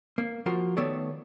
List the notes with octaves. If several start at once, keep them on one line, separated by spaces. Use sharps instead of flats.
A#3
F3 F4 F#4 A#4
D#3 A3 B3 A4 C#5 D5